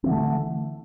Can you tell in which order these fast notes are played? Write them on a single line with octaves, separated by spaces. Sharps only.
C4 E3 D3 A3